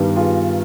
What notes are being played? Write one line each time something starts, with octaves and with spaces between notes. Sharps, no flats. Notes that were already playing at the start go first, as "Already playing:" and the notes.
Already playing: G2 D#3 G3 B3
F4 G#4